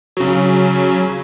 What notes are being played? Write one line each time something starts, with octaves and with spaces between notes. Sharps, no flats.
C#3 F#3